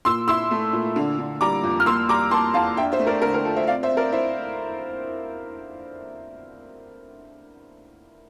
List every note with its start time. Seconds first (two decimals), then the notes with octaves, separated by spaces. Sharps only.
0.05 A#2 C6 E6
0.28 E4 C6 E6
0.51 A3
0.73 A#2
0.96 D3
1.19 D3
1.41 G3 A#5 D6
1.64 F2
1.80 F6
1.86 A#3 C6 E6
2.09 G3 A#5 D6
2.31 A#3 A5 C6
2.54 E2 F5 A5
2.77 D4 E5 G5
2.92 C5 E5
2.99 A3
3.07 A#4 D5
3.22 D3 A#4
3.34 A#4
3.45 F4 A4
3.56 C5 E5
3.67 C4 D5 F5
3.83 C5 E5
3.90 C4
3.97 A#4 D5
4.12 E4 C5 E5